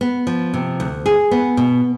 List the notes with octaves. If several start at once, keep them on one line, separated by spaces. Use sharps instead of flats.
B3
F3
C3
D2
G#4
B3
B2